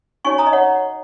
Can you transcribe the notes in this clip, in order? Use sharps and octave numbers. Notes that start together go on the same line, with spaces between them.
D#4 F#4 C#5 G#5 C#6
A#5 D#6
D#5
C#5 F#5